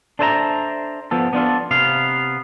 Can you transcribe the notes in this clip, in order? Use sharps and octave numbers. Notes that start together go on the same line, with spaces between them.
D4 A4 C5 E5 G#5 A#5
F3 B3 A4
B3 D4 F4 A4
C3 B3 F5